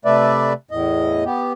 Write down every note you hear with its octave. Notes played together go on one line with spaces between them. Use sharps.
C3 A3 B4 D5 E5
E2 A2 D#5
B3 G4